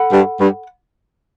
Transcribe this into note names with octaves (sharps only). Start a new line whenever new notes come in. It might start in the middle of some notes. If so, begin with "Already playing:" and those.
Already playing: A4 F#5 B5
G2
G2